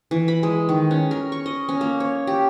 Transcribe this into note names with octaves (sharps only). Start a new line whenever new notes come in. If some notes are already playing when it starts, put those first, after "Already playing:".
E3
B5
G#3
D#3
C#4
A#4
C#6
D#5
C#4
A#3
C#5
G4